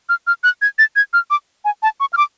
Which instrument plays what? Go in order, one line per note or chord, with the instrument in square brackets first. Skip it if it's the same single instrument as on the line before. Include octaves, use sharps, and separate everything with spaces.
[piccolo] F6
F6
F#6
G#6
A6
G#6
F6
D6
G#5
A5
C#6
F6
D6